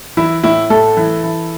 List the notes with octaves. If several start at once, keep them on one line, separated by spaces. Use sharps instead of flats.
E3 E4
A2 E4
A2 A4
E3
E3